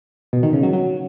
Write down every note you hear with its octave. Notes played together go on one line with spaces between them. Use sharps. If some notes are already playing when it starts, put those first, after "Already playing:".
B2
D#3
C#3
F#3
F#3